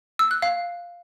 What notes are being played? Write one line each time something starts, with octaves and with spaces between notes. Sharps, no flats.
E6
F#6
F5